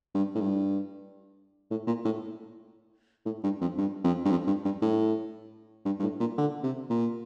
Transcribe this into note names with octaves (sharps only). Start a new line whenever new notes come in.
G2
A2
G2
A2
A#2
A2
A2
G2
F2
G2
F2
G2
F2
G2
G2
A2
G2
G2
A2
A#2
D3
C3
A#2